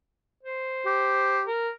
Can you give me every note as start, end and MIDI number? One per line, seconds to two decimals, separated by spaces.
0.43 1.40 72
0.86 1.45 67
1.47 1.70 70